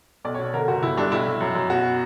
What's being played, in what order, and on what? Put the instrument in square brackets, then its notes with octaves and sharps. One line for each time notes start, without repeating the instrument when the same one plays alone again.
[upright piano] B1 D5
B2 C#5
D3 A#4
G1 F#4
G1 E4
G2 D4
B1 E4
B1
F#2
F#2
B2 F#4